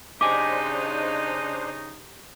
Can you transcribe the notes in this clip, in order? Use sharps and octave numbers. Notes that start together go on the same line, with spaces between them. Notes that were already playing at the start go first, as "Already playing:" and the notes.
C#3 D4 D#4 G4 C5 D#5 G#5 D6